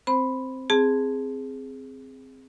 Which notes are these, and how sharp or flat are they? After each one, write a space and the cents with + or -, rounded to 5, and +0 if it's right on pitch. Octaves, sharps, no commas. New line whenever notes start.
C4 +0 C5 +0 B5 +0
C4 +0 G#4 +0 A5 +0